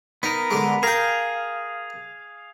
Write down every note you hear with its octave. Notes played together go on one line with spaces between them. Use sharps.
B3 D#4 A#4
D3 G#3
G#4 A#4 F5 G5